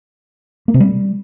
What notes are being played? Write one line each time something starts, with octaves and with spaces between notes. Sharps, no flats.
A#3
C3
G3